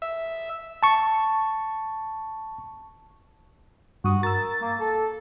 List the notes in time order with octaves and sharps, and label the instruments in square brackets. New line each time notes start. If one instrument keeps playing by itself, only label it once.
[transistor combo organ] E5
[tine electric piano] A5 C#6
[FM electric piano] G2 D#6 [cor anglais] F#4
[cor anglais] A#4 [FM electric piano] E6 A6
[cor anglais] A#3
A4